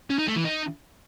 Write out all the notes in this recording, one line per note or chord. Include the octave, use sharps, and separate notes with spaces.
C#4
D#4
A3
E3
D#4